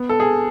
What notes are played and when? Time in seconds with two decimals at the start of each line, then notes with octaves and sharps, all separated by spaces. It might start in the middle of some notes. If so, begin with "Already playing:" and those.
Already playing: B3
0.09 A4
0.20 G#4